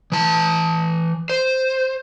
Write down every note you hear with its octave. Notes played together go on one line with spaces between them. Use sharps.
E3 A5
C5